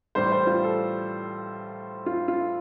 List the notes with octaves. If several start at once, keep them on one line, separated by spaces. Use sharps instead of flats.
A2 E3 G3 C5
C5
F4
A4
F4
F4